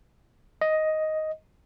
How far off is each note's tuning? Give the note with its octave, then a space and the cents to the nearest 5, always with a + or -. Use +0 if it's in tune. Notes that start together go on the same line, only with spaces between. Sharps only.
D#5 +5